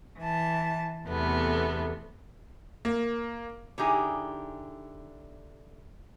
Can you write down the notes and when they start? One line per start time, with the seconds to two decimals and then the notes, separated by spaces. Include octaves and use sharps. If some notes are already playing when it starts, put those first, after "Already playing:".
0.18 E3 A5
1.07 E2 C3 A3 B3 A4
2.85 A#3
3.78 D3 D#4 E4 G4 G#4 G#5